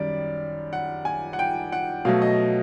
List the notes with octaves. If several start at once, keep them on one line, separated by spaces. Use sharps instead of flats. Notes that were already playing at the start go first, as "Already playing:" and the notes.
Already playing: F#2 D#3 G3 D5
F#5
G#5
F#5
G5
F#5
B2 F#3 A3 F5
D#5